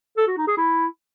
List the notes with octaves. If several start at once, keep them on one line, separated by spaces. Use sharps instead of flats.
A4
F#4
D#4
G#4
E4